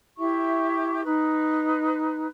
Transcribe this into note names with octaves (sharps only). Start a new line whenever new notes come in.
E4 G4 E5 C#6
D#4 B4